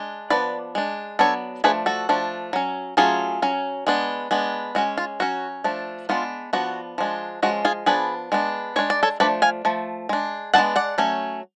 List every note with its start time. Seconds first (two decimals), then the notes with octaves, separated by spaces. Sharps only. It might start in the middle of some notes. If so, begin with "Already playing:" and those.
Already playing: G#3 D4
0.30 F3 B3 D4 B4 D5
0.75 G#3 D4
1.19 F#3 B3 D4 A4 C#5
1.64 F3 A3 D4 G#4 B4
1.86 F#4 A4
2.09 F3 A3 D4
2.53 F#3 C#4
2.97 F#3 A3 C#4 F4 G#4
3.42 F#3 C#4
3.87 G#3 B3 D4
4.31 G#3 B3 D4
4.75 G#3 C#4 F#4
4.98 F4
5.20 F#3 C#4 F#4
5.64 F3 A3 D4
6.09 G#3 B3 D4 F4
6.53 F3 B3 D4 F#4
6.98 F3 G#3 D4
7.42 F3 G#3 C#4 F#4
7.65 F4 G#4
7.86 F3 B3 D4 G#4 B4
8.32 G#3 B3 D4
8.76 G#3 D4 C#5
8.90 D5
9.03 A4 C#5
9.20 F3 A3 D4 B4 D5
9.42 F5 G#5
9.65 F3 A3
10.09 G#3 D4
10.54 G#3 B3 D4 F#5 A5
10.76 D5 F#5
10.98 F#3 A3 C#4